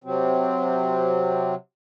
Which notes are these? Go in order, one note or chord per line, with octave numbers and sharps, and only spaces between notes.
C3 F#3 C4